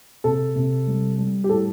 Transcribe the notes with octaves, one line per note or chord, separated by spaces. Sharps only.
C3 A4
C3
G3
G3
G4
A2 A4